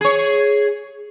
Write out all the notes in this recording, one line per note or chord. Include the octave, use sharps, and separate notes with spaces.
G#4 C#5